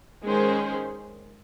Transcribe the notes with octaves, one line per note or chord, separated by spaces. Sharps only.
D#3 G#3 C#4 G#4 C5